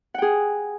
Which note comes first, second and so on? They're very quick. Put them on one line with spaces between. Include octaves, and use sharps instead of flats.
F#5 G5 G#4